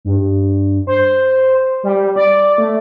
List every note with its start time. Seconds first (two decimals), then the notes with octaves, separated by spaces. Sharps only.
0.05 G2
0.87 C5
1.83 G3
2.16 D5
2.58 A3